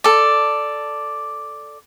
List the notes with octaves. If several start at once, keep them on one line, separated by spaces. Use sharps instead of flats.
A4 D5